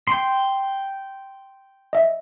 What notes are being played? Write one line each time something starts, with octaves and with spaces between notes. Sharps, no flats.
G5 C6
D#5 E5